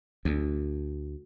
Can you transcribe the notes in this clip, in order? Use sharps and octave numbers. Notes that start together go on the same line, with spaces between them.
D2